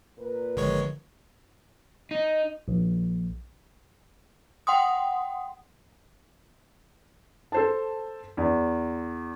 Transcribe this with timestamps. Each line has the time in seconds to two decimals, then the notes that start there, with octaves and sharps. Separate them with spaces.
0.18 A#2 A#4 B4
0.57 G#1 D3 F3 G#3 C#5
2.11 D#4
2.68 A#1
4.67 F#5 G5 C6 D#6
7.52 A4 C5 A5
8.37 E2